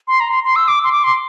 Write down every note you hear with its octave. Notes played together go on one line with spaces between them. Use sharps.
C6
A#5
C6
C6
E6
D6
C6
D6
C6